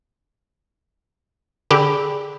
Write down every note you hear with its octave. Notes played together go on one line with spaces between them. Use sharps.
D3 G4 G#4 B5